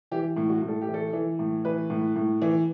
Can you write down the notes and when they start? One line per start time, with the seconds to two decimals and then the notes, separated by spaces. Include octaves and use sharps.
0.11 E3 G4
0.37 A2
0.49 F#4
0.62 A2
0.68 A4
0.81 G4
0.88 E3
0.94 A4
1.13 E3
1.39 A2
1.65 E3 B4
1.90 A2
2.16 A2
2.42 E3